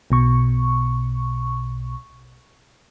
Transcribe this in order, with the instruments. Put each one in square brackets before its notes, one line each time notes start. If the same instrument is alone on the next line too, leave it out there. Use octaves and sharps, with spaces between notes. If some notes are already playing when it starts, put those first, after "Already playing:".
[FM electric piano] B1 B2 C#6